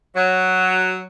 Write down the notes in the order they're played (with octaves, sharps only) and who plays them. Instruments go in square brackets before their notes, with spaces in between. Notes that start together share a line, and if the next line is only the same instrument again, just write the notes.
[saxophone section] F#3